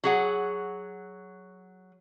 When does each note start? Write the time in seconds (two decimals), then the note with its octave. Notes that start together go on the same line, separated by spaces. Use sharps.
0.04 F#3 G#4 F#5